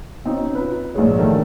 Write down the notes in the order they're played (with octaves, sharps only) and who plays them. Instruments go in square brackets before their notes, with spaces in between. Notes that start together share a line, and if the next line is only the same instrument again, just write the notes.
[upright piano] B2 C4 C#4 D#4
F4 B4
A#1 G#2 G#4 C#5
D3 D#3 A3 E4 A4 A#4